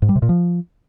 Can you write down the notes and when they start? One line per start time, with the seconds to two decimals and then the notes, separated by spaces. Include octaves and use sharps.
0.02 G#2
0.09 G3
0.16 C3
0.22 A#2
0.29 F3